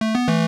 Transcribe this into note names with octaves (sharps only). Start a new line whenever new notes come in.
A3
B3
E3 A3